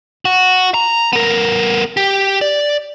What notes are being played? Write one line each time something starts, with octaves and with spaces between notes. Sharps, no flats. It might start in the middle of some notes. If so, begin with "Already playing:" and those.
F#4
A#5
B3 A#4
G4
D5